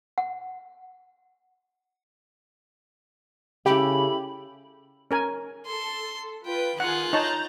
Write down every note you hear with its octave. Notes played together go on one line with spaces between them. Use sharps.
F#5
C#3 E4 G4 A4 G5 B5
C#4 A#4 G#5
A4 C6
F4 B4 G5
D#3 F4 G#4 F#5 F#6
D#4 C#5 A5 A#5 G6 A6